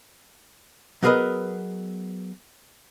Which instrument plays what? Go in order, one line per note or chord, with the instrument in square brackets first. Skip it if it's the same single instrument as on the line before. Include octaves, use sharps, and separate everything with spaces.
[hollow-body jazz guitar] F#3 B3 G#4 A#4 B4 D#5